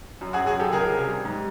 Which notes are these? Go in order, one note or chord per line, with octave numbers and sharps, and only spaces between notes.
F#2
F#4 G#4
F#2
F#4 G#4
F#2 G4 A4
C#2 G#4 A#4
C3
G3
G#2